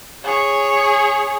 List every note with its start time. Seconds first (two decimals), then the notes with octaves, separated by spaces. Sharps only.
0.24 G#4 C#5